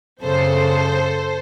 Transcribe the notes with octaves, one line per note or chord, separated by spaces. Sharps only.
F#2 C#3 A4 C5